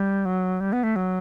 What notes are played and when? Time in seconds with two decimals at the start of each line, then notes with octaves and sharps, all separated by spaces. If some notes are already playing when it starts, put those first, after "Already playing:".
Already playing: G3
0.25 F#3
0.60 G3
0.73 B3
0.83 A3
0.96 F#3